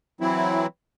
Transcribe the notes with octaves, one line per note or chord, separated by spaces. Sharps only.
E3 F#3 C4 E4